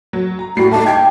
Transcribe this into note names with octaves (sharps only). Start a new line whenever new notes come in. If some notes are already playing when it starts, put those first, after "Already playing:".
F#3
A#5
A2 G3 F#4 C7
A3 D#4 A5
G5 G#6